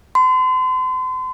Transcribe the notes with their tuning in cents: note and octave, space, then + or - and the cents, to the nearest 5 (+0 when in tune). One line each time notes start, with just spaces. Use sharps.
C6 -40